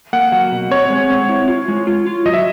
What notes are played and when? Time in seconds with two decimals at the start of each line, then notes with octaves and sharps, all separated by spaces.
0.13 A#3 F#5
0.32 F#3 F#5
0.52 B2
0.71 C4 C#5
0.90 G#3
1.10 C4
1.29 E4
1.48 F4
1.68 G#3
1.87 F4
2.07 F4
2.25 F#3 D#5
2.34 E5